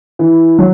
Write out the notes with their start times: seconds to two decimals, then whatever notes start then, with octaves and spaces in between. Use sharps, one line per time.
0.19 E3
0.59 F#3